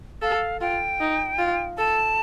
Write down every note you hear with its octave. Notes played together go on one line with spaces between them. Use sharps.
A4 F5
F4 G5
D#4
F4
A4 A5